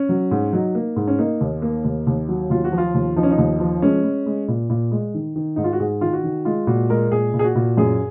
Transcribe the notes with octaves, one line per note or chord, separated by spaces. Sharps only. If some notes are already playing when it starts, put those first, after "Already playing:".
Already playing: C#4
F#3
G#2
F#3 D#4
A#3
G#2
C#4
A#3 D#4
D#2
A#3
D#2
D#2
F#3
D#2 F4
F#4
F3
F4
D#2
F3 D#4
C#4
D#4
D#2
F3
G#3 C#4
G#3
G#3
A#2
A#2
G#3
D#3
D#3
G#2 D#4
F4
F#4
G#2 G#4
D#3 F4
F#4
D#3
G#3 F4
A#2 F#4
G#3 A#4
A#2 G#4
A#2
G#4
F#4
A#2
F#2 G#4